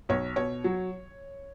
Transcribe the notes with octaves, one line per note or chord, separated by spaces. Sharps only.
B1 C#5
B2 C#5
F#3